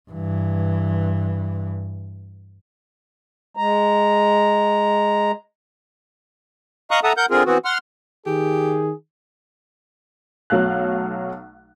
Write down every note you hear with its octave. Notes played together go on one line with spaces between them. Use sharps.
G2 E3
G#3 A#5
D#5 F5 A#5 C#6 D#6 F#6
A4 E5 F#5 A5 A#5 D#6
A#4 F#5 G6
D3 C4 F4 G#4 A#4
E3 B3 C4 F#4
F#5 C6 F6
D#3 G4 G#4
B1 F#3 A3 F5 F#6